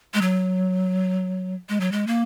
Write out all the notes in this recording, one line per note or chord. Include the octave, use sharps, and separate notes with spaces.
G#3
F#3
G#3
F#3
G#3
A#3